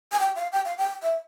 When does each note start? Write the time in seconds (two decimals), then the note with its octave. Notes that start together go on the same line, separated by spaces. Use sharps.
0.12 G#5
0.19 G5
0.36 F5
0.52 G5
0.65 F5
0.78 G5
1.02 E5